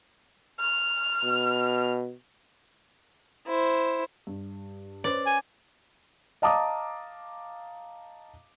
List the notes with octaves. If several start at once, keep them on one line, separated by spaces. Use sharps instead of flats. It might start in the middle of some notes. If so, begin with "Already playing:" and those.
F6
B2
E4 C5
G2
C#4 B4 C5 D5
G#5
D#5 F5 A5 A#5 D6 D#6